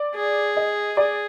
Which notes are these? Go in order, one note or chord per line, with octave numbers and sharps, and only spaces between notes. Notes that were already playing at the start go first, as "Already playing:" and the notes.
Already playing: D5
G#4
D#5
G#4 D5